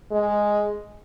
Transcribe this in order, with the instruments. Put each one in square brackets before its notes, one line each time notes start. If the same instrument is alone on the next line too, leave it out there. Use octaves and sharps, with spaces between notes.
[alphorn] G#3